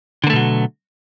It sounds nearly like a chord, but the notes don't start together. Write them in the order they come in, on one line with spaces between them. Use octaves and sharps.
D3 A#3 A3 B2 F#3